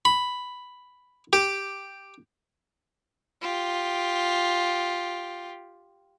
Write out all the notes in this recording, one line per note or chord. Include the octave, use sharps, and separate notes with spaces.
B5
G4
F4 G4